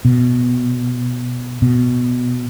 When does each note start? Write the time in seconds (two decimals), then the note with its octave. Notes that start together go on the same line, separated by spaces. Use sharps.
0.05 B2
1.62 B2